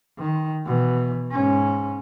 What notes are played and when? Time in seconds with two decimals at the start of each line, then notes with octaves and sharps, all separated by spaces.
0.19 D#3
0.66 B2 E3
1.31 G#2 C#4